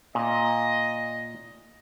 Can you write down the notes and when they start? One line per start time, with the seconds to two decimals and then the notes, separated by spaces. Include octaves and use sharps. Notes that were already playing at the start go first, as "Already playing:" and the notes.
0.15 A#2 D#5